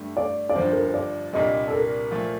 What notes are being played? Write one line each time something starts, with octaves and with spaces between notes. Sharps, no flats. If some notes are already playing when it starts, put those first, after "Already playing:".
Already playing: G2 D3 A3
D5
D5
G1 G2 D3 F3 C5
A#4
C5
D5
C2 A#2 G3 D4 D#5
A4
A#4
A#2 F3 A3